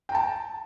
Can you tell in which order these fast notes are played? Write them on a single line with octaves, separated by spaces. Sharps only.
G5 A#5 A5